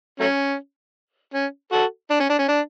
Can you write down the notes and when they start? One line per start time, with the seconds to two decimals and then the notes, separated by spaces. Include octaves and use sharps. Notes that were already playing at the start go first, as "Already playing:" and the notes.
0.20 F#3 A3 C#4
1.34 C#4
1.72 F#4 A4
2.10 D4
2.20 C#4
2.30 D4
2.39 C#4
2.48 D4